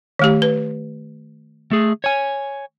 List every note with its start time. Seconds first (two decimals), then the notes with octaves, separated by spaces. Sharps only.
0.19 D#3 A3 G4
0.42 B4
1.71 A3 G#4
2.04 C#5 G#5